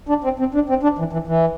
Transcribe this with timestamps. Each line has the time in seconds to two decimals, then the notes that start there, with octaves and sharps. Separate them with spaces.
0.09 D4
0.24 C4
0.39 C4
0.54 D4
0.69 C4
0.83 D4
0.99 E3
1.13 E3
1.28 E3